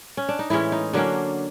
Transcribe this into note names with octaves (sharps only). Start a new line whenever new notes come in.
C#4
D4
D#4
A2 E3 G#3 C#4 E4
D#4
D3 F#3 A#3 C#4 D4